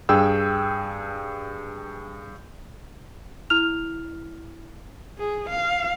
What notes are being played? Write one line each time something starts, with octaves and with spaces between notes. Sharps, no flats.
G2 G#4 G5 E6
E4 F6 F7
G#4
F5